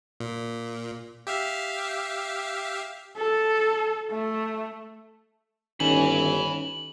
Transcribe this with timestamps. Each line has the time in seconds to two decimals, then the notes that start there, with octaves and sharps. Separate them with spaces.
0.20 A#2
1.27 G4 E5 F5
3.17 A4
4.11 A3
5.80 G1 D#3 C#4 D#4 G#5 B5 F#7